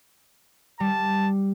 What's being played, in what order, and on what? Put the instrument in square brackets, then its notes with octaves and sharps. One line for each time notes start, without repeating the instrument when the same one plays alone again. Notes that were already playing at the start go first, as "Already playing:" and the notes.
[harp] G3 [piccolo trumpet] A5